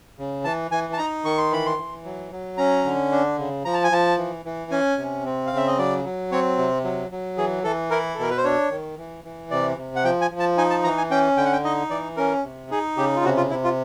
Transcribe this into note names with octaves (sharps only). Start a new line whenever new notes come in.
C#3
E3 A5
E3 G#5
A5
D#4 A#5
D#3 C#6
C6
E3 B5
C6
E3
F#3
F#3
C#4 A#5
D3
D4
C#3
F3 A#5
A5
G#5
F3 A5
E3
E3
C#4 G#5
C3
C4
C#3 F5
E5
D#5
F#3 D5
F#3
C4 C#5
C3
F#3
F#3
E3 G#4
E3 A4
E4 A#4
A4
B2 A#4
B4
C5
D4 C#5
D#3
E3
E3
C3 D5
C3
F#5
F3 G5
G#5
F3
A5
D#4 G#5
A5
E3 A#5
G#5
C#4 G5
D3 G5
F#5
G5
D#4 D#5
E3 D5
C#4 A#4
C3
D#4 G#4
C#3 G4
F4
C3 F#4
F4
C3 E4
F4